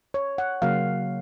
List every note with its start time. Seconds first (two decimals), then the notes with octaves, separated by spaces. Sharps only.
0.14 C#5
0.38 F#5
0.62 C#3 F#3 A#3 F5